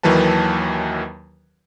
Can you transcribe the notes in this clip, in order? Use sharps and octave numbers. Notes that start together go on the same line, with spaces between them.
D#2 D#3 E3 F#3 B4 A5